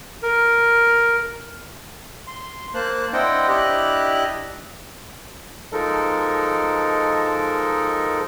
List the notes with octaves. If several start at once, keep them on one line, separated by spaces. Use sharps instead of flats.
A#4
C6
A#3 C5 A5 F#6
C4 D4 E4 D#5 F#5 G5
D4 E4 G4 D#5 B5 F#6
F3 G#3 D#4 A4 A#4